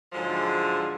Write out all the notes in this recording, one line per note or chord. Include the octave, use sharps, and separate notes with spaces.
G#2 D3 F3 F#3 G#3